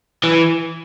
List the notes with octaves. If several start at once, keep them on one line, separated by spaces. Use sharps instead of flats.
E3